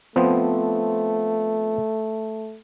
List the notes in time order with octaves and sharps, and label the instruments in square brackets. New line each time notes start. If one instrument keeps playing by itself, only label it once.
[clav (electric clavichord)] F3 B3 C4 [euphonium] A3